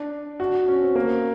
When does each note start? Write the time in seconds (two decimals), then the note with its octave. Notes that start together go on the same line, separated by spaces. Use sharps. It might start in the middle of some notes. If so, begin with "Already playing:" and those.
Already playing: D4
0.40 F#4
0.68 C#4
0.82 C4
0.95 A#3